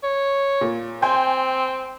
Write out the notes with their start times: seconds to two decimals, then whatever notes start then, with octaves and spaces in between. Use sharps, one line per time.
0.03 C#5
0.61 A#2
1.02 C4 G5 G#5 C6